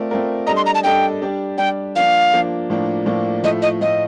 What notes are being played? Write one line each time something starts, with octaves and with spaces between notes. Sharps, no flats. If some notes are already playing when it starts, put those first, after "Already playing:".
Already playing: A3 C4 F4 A#4 D5
A3 C4 F4 A#4 D5
G3 D4 A4 D#5 A#5
C6
A#5
A5
G3 D4 A4 D#5 G5
G3 D4 G4 D5
G3 D4 G4 D5 G5
F3 A#3 D4 F5
F3 A#3 D4
A2 F3 A#3 D4
A2 F3 A#3 D4
A2 F3 A3 D#5
D#5
A2 F3 A3 D#5